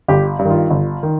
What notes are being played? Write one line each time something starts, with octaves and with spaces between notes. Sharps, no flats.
G1 G4
G2
D#3
F4
G1
D#3